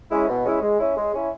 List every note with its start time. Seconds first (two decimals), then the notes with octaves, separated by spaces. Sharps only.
0.11 G#3 C#4 E4
0.28 B2
0.45 G#3 C#4 E4
0.61 G#3
0.79 C#4 E4
0.96 G#3
1.13 C#4 E4